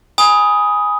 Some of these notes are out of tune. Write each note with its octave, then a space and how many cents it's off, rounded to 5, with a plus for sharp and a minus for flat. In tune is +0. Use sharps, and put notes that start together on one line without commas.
G#5 -5 B5 -10 D#6 +10